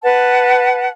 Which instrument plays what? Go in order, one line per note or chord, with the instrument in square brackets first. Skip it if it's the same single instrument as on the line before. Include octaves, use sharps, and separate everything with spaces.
[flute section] B4 F#5 A5